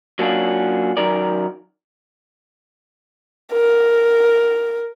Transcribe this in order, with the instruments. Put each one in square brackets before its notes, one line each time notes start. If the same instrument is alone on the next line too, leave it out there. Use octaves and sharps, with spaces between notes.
[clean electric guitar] F#3 A#3 C#4 D4 F4 F#4
F#2 D#3 F#3 A#4 D5
[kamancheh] A#4